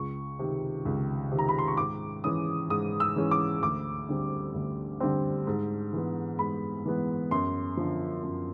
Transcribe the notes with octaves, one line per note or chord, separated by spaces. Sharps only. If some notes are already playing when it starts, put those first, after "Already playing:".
Already playing: C#2 C#6
C3 D#3
C#2
C3 D#3
A#5
B5
C6
C#6
G#2 D6
E3 G#3 C#4 D#6
G#2 D#6
E6
E3 G#3 C#4
D6
D2 D6
D3 G3 C4
D2
D3 G3 C4
G#2
E3 G#3 B3
G#2 B5
E3 G#3 B3
F#2 C6
D3 F3
F#2